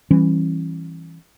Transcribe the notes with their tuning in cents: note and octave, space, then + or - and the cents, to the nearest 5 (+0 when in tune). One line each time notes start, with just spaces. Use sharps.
E3 +0 G3 +0 C#4 -30